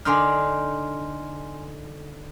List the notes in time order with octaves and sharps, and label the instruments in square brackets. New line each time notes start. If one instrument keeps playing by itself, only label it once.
[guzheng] D3 D4 D#4 [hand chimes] G#5 C6 F6